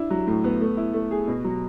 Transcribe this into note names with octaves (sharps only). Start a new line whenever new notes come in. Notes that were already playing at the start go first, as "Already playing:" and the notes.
Already playing: D4 E4
F#3
A2
B3
A3
E4
A3
G#4
B2
F#3